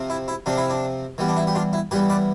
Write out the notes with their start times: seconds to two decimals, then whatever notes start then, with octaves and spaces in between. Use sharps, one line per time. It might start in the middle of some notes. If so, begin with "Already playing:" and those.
Already playing: C3 F3 C4
0.10 E4
0.28 E4
0.46 C3 F3 C4 D4
0.58 E4
0.70 D4
1.18 E3 G3 B3
1.28 D4
1.37 E4
1.47 G4
1.55 D4 F4
1.73 E4
1.91 E3 G3 B3 G4 B4
2.10 B4 D5